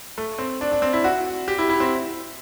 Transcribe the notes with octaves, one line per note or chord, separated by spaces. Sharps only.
A3
C4
D4
D4
C4
E4
F#4
G4
E4
E4
C4